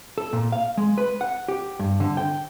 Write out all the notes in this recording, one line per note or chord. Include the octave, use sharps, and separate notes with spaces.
A4
A#2
F5
G#3
B4
F#5
G4
G2
D3
G5